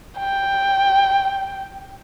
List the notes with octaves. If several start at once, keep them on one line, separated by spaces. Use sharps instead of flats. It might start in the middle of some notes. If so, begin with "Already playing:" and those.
G5